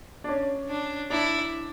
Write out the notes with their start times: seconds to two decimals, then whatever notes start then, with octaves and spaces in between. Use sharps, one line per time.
0.24 D4
0.28 C#4
0.69 D4
1.10 D4 E4